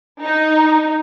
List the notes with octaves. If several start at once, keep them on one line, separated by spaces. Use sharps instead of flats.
D#4